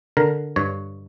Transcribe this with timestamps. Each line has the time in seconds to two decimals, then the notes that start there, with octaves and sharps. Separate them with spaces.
0.17 D3 A#4
0.56 G2 C#5